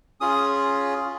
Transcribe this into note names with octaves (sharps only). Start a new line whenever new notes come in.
C#4 F4 G#4 D#6